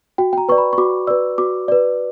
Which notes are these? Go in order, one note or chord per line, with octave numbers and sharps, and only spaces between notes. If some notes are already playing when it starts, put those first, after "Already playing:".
F#4 G5
G5
A#5
B4 D5 C#6
B5
C#6
F#4 D6
B4 D5 E6
F#4 D6
B4 D5